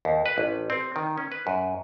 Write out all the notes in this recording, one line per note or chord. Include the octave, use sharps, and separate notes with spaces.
D#2
B4
A1
C4
D#3
C#4
B4
F#2